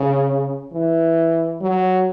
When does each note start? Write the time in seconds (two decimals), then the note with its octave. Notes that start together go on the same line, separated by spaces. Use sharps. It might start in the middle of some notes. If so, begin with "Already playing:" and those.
Already playing: C#3
0.73 E3
1.61 F#3